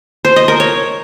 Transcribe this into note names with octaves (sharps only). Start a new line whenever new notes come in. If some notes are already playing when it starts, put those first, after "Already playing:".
C5
D#5
A#4
C#5